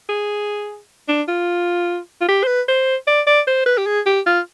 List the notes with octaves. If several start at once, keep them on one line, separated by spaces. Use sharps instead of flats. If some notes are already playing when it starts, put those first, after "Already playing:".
G#4
D4
F4
F4
G4
C5
B4
C5
D5
D5
C5
B4
G4
G#4
G4
F4